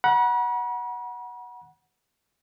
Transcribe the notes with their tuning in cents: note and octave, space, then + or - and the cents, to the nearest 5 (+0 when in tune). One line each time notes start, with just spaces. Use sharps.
F#5 +0 B5 -45